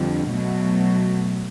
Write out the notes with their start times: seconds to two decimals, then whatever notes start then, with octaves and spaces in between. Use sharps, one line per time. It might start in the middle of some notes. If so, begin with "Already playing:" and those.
Already playing: F2 D3 G3
0.30 B2 F#3 A3